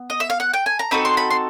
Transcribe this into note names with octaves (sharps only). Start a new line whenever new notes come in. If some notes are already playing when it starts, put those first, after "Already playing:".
Already playing: B3
D#5
E5
F5
F#5
G5
G#5
A#5
C4 D#4 F#4 A4 B5
C6
B5
C6